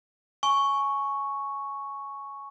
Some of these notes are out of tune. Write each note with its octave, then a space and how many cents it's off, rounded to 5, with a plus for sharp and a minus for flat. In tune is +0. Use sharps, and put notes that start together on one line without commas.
G#5 +20 C#6 +0